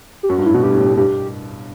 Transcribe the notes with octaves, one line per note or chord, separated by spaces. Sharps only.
G4
F#2 F#4
G2
A2 E4
B2 F#4
G2 G4
A2
A2
G2 G4